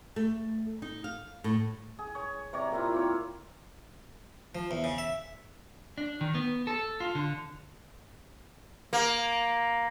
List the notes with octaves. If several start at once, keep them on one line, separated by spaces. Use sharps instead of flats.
A3
D#4
F5
A2
G#4
C#5
C3 C#5 D5 A#5
A#2 A#3 E4 F4
C4 C#5
F3
E2
C#3
E5
D4
D#3
B3
A4
F4
D3
A#3